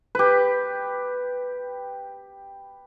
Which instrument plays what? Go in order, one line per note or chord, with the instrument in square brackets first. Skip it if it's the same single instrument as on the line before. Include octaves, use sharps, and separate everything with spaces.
[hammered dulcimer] G4 B4